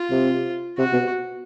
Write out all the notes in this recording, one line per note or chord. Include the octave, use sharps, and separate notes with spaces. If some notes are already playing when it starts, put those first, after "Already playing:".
Already playing: F4
C3
C3 F#4
B2